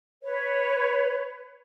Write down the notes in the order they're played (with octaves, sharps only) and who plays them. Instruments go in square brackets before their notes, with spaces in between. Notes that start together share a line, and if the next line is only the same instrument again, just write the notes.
[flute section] B4 C#5